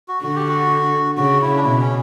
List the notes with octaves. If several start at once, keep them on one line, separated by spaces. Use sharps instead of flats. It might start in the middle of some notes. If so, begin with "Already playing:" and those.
F#4
D3 F#4
G4
F#4
C#3 F#4
E4
D4
B2 E4
C#4